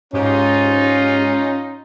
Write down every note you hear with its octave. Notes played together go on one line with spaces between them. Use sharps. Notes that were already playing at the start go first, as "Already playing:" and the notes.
G#2 C#4 D#4 F4 G4